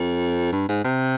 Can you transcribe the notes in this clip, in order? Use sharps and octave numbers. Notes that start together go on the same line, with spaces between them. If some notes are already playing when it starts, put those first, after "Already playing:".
Already playing: F2
G2
G#2
C3